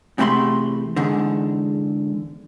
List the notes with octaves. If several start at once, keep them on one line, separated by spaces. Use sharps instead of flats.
E2 C3 A3 E5 B5 C6
E2 G#2 D3